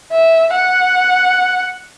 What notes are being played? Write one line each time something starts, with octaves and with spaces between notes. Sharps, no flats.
E5
F#5